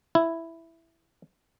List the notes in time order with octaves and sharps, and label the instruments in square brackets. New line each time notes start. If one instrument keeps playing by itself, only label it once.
[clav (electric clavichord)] E4